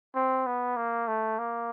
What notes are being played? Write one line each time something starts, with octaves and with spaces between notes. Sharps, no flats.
C4
B3
A#3
A3
A#3